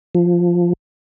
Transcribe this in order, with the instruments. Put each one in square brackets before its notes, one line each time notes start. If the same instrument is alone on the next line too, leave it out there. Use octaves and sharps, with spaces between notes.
[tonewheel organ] F3